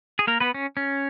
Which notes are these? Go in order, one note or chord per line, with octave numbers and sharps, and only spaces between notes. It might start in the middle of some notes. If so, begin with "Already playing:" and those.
G#4
A#3 A#4
B3 B4
C#4
C#4